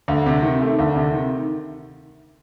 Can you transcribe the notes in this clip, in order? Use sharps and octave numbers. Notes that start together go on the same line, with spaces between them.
D2
C3
D#3
A3
D2
C3
D#3